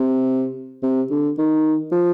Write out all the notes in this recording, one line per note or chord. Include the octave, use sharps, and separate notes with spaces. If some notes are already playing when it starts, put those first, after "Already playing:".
Already playing: C3
C3
D3
D#3
F3